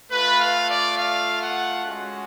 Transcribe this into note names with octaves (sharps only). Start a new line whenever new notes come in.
A3 F4 B4
F5
D5
F5
F#5
G#3 C#4 F#4